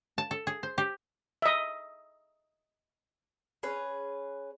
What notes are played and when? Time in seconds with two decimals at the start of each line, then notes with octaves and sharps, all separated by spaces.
0.18 A5
0.31 A4
0.47 G#4
0.63 C5
0.78 G4
1.42 D#5 E5
3.63 C#4 G#4 B4